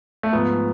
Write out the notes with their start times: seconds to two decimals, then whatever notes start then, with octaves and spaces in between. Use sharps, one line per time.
0.23 A3
0.33 G#2 F3 B3